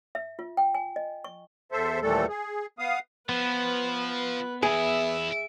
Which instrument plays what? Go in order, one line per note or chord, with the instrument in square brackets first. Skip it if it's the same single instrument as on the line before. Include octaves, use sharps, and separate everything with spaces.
[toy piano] E5
F4
G5
G#5
D#5
C#6
[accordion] E2 A4 C5 E5
D#2 A#2 E3 G3 A3 A4
G#4
B3 F5 D#6
[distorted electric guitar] F3 [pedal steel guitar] B3 [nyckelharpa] B4
[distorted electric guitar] E2 E4 [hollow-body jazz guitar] G#4 [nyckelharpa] E5